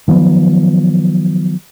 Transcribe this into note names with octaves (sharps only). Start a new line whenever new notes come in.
D#3 F3 F#3 B3